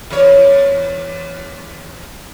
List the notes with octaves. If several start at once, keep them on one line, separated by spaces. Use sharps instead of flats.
E2 C#5